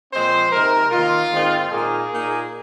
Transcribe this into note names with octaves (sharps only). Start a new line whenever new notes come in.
A#2 F3 G#3 C4 C5
C3 G#3 D#4 A#4
D#3 A#3 D#4 F4
G#2 D#3 C4 D#4
A#2 A#3 D#4 G#4
A#2 A#3 D#4